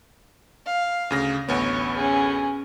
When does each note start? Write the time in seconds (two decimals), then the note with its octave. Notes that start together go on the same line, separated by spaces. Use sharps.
0.67 F5
1.10 D2 C#3 A#6
1.49 A1 D2 B3 C#5
1.96 C#4 G#4